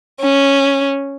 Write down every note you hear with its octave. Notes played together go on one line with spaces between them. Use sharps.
C#4